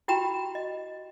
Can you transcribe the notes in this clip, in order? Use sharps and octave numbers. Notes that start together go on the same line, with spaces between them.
E4 F#4 G4 G5 A#5 B5
D#5